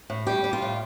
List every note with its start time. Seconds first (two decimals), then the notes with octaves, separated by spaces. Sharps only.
0.10 A2
0.27 G3 G4
0.44 G3
0.53 F4
0.62 A2